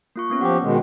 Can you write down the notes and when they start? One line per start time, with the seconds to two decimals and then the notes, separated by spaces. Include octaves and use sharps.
0.16 A#3 F4 C#6
0.30 A#3 B3 C#4
0.41 F3 G4 F#5 G5
0.63 B2 D#3 G#3